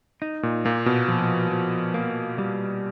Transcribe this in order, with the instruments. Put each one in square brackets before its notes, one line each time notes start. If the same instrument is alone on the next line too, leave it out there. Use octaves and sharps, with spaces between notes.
[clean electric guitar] D#4
[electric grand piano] A#2
[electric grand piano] A#2 [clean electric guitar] A#3
[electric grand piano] B2
[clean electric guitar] F3
F3
A#3
G3